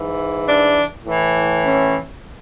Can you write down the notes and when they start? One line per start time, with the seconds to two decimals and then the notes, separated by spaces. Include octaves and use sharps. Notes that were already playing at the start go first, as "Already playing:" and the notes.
Already playing: G#2 E3
0.47 D4
1.05 A2 E3
1.63 C#4